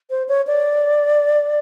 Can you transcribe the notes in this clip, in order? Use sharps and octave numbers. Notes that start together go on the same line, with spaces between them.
C5
C#5
D5